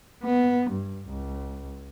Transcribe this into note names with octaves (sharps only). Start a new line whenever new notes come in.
B3
G2
C#2